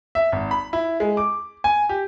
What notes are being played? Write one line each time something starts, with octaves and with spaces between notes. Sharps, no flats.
E5
G#1
B5
E4
G#3
D6
G#5
G4